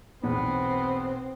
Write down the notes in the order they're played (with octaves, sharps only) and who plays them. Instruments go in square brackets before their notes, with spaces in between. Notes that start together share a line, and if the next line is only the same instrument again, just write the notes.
[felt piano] B1 E2 B2 [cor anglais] B3 [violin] C4